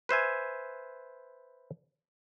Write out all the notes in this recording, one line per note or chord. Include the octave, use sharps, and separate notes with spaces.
B4 C5 E5 G#5